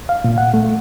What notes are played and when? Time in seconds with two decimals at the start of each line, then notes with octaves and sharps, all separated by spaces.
0.09 F5
0.24 A#2
0.38 F#5
0.54 A3